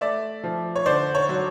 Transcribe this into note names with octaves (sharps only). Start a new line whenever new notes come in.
A3 D5 E5
F3
C#5
D3 C5 D5
C#5
F#3